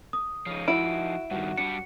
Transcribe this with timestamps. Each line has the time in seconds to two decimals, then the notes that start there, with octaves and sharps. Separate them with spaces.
0.13 D#6
0.46 C#3 F3 D#4
0.68 E4 F#4 D7
1.31 G2 D#3 F#4
1.58 G3 D4 C#7